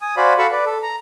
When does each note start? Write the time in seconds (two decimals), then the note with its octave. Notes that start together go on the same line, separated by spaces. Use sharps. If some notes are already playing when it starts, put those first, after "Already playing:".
0.02 G#5 D#6
0.17 F#4 C5 D5 F5 G#5 B5
0.38 F#4 A4 F5 A5 B5 C#6
0.52 B4 D5
0.66 A4
0.83 A#5